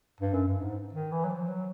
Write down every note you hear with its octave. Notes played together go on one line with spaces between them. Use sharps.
G2
F#2
G2
G#2
D#3
E3
F#3
F3
F#3